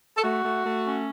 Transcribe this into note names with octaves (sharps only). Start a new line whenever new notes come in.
A4
A3 F#4
A3
A3
C#4